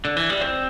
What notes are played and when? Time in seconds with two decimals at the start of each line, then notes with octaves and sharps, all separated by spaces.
0.05 D3
0.17 E3
0.30 G3
0.41 C4